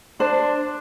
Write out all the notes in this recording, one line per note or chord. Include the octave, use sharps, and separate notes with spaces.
D4 C5